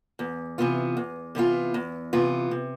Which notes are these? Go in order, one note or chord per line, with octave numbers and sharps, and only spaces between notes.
E2
C3 E3 B3 F4
E2
C3 E3 B3 F4
E2
C3 E3 B3 F4
C3